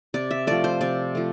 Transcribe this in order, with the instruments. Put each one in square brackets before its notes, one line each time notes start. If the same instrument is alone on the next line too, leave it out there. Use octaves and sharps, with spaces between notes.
[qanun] C3 D5
E5
F3 A3 D5
C5
C3 D5
F3 A3